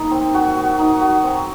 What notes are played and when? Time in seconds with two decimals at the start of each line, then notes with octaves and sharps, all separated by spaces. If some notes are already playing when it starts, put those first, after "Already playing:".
Already playing: A#3 D#4
0.11 C4
0.34 F#4
0.56 F#4
0.79 D#4
1.01 F#4
1.23 C4